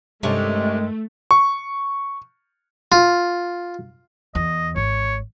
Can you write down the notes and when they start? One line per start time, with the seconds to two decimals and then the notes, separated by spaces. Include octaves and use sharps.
0.23 G2 C3 D#3 G#3 A3 C#4 D4
1.31 C#6
2.92 F4
4.35 E2 D#5
4.76 G#1 C#5